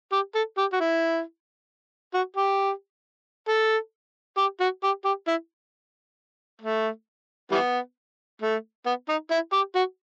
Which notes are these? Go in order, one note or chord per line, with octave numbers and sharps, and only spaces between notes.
G4
A4
G4
F#4
E4
F#4
G4
A4
G4
F#4
G4
G4
E4
A3
E3 G3 B3
A3
B3
D#4
E4
G4
F#4